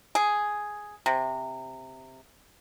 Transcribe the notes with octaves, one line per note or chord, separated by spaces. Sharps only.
G#4
C3